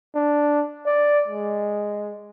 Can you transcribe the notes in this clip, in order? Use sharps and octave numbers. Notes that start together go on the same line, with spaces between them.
D4
D5
G#3